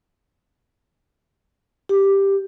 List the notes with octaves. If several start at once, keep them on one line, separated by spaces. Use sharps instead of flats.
G4